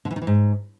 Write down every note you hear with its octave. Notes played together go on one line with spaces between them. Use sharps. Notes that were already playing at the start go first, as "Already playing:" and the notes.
D3
E3
D#3
E3
G#2